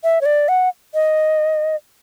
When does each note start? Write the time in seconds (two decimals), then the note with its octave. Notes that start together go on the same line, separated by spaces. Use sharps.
0.04 E5
0.21 C#5
0.26 D5
0.48 F#5
0.94 D#5